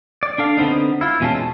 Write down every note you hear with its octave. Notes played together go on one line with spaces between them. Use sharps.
D5
D4 A4 F5
D3 B3 C4 D#4
E4 F4
E2 B2 G#3 C#4 F4 A5